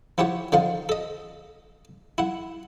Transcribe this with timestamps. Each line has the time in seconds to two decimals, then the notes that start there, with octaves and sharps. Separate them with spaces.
0.18 F3 E4 G4 C#5 F#5
0.52 D3 F3 D#4 F5 F#5
0.89 A4 D#5
2.18 E4 F#5